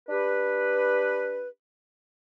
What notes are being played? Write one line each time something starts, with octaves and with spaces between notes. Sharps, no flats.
D4 G4 B4